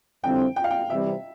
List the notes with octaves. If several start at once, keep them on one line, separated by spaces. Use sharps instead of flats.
F2 D3 G3 C4 E4 G5
G5
F5
G5
C3 E3 G3 C4 E5